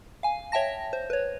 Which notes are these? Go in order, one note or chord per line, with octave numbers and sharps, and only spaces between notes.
F5 G#5
C#5 E5 G5 A5 A#6
C5
B4 C#5